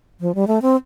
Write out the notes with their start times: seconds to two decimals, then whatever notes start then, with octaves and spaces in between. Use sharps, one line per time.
0.21 F3
0.35 G3
0.47 A3
0.62 C4